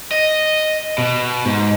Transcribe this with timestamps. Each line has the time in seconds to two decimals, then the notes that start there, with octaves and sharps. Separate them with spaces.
0.11 D#5
0.98 B2
1.45 G#2